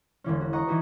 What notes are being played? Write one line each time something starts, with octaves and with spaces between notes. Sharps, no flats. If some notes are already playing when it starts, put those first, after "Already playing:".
E1 D3 E3 C#4
F#4
D#5 F#5 A#5 C#6
E3 D#4 F#4 B4